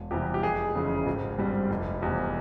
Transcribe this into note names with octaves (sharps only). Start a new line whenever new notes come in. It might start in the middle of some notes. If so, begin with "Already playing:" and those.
Already playing: E1
E2 C3 E3 G3 G4
G4
F1 G#4
F2 C#3 E3
G#1
G2 G3 C4
F1
E2 C3